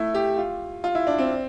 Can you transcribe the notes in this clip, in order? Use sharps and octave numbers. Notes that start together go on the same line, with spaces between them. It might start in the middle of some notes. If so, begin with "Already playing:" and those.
Already playing: A3 E4
G4
F4
F4
E4
D4
C4